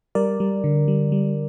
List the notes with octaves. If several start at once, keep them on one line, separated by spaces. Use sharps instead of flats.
G3 A#4 D5
G3
D3
G3
G3